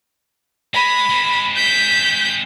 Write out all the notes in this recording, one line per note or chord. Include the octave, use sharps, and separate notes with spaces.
G#3 B5
G#3 C4
G6 B6